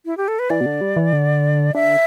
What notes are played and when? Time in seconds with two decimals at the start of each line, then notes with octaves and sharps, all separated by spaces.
0.06 E4
0.17 G4
0.28 A4
0.39 B4
0.50 E3 D5
0.61 B2
0.66 D3
0.81 G3
0.96 E3
1.13 D3
1.75 D3 E5